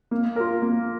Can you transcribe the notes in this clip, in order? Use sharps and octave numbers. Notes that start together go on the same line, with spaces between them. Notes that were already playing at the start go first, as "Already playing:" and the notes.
A#3
F4 A#4
A#3